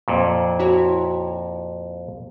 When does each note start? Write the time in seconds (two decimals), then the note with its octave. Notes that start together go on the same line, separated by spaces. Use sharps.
0.08 F2 A#2
0.59 E4 F#4 C#5